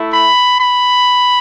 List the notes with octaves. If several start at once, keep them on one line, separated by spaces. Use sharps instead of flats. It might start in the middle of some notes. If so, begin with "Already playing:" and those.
Already playing: A3 E4
B5
B5